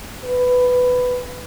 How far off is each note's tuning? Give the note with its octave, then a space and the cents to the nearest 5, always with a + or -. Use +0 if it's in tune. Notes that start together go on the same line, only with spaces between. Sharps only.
B4 +10